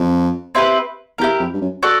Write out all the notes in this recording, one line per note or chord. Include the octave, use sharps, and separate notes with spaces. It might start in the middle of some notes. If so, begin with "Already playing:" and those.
Already playing: F2
C4 E4 G4 B4
E2 E4 G4 A#4
F2
G2
F#2
F#4 A4 D5